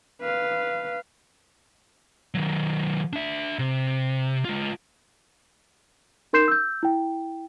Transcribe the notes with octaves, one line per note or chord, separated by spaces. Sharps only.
B4 F5
D#3 F#3
D4 E5
C3
G#3 F4
D#4 A#4 C6 G6 C7 E7
E6 G6
E4 G5